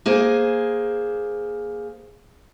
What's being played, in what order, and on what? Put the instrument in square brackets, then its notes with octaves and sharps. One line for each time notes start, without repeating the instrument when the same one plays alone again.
[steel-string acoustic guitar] A#3 G#4 C5 G#5